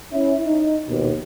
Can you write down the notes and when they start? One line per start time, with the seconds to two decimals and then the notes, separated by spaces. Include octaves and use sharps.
0.13 C#4 E4
0.46 D#4
0.89 A#1 D#2 B2